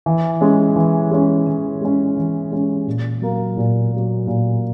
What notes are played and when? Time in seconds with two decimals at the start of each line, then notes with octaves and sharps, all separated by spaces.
0.06 E3
0.41 G#3 C#4
0.76 E3
1.11 G#3 C#4
1.47 E3
1.81 G#3 C#4
2.17 E3
2.51 G#3 C#4
2.87 A#2
3.22 F#3 A#3
3.57 A#2
3.91 F#3 A#3
4.27 A#2